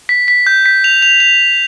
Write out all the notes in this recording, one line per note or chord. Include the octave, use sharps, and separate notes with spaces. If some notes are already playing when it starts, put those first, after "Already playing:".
B6
B6
G6
B6
F7
F7
F7